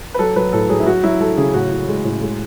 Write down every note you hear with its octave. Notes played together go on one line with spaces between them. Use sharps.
B4
F#3 A4
F#3 B4
A2 A4
F#3 G#4
E4
F#3 F#4
F#3 E4
F#3 A4
C#3 G#4
A2 F#4
A2
G#3
A2
G#3